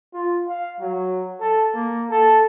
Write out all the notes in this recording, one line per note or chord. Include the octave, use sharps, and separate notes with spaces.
F4
F5
F#3
A4
A#3
A4